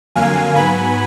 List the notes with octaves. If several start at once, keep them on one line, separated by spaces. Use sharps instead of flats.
F2 D3 F#3 A#3 F5 G#5
G#2 F#3 B3 G#5 B5